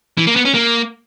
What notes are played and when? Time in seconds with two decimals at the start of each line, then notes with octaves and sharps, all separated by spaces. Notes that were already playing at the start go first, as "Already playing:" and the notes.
0.18 E3
0.27 A#3
0.36 B3
0.45 C#4
0.54 A#3